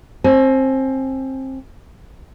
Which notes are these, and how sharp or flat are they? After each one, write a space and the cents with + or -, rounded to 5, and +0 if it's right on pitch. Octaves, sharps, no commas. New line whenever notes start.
C4 +20 G#5 +35